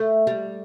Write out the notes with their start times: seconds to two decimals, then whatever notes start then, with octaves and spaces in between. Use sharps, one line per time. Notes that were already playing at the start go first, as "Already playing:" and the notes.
Already playing: A3
0.27 G3